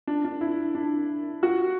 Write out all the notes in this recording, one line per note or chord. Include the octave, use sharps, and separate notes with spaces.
D4
D4
E4
D4
F#4